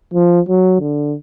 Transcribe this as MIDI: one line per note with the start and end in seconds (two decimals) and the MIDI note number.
0.14 0.40 53
0.49 0.77 54
0.81 1.15 50